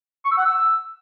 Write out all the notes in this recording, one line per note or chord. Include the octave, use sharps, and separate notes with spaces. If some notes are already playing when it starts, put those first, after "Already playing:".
C#6
E6
F#5
E6